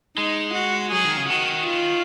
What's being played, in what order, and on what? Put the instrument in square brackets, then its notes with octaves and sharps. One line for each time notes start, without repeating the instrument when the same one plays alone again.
[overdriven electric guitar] G#3 [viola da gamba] D#4
[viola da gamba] F#4
[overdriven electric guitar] F#3 [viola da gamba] G#4
[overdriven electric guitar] D#3
C#3
[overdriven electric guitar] D#3 [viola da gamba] F#4
[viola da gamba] F4